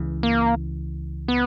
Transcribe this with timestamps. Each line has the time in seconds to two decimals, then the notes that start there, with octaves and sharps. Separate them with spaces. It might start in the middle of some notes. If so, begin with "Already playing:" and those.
Already playing: C#2 C#3 E3
0.23 A#3
1.28 B3